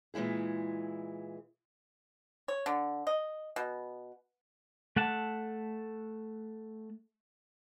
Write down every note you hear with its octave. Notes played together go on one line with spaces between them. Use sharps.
A#2 E3 G#3 E4 G#4
C#5
D3
D#5
B2
A3 F#5 A5